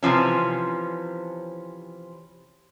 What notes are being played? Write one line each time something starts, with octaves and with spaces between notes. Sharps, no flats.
C3 E3 F3 C#4